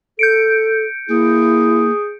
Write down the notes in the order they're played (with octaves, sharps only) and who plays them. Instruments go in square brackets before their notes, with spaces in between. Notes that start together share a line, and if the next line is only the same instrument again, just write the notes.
[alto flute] A4 [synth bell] G6 C#7 D7
[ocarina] A#3 [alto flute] E4 [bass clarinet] G#4